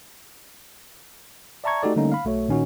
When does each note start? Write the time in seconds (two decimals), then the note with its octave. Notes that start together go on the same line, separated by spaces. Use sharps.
1.64 D5 E5 A5 A#5 C#6 G#6
1.83 A3 D#4 F#4 G4 A4 D5
1.96 D3 G3 A3 A#3 C#4 D#4
2.12 F5 B5
2.25 B1 A3 F#4 C#5
2.48 A#2 D#3 C#4 D#4 F#4